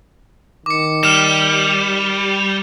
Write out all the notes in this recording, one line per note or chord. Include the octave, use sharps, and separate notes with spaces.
D#3 D6 C#7
G3 F6 E7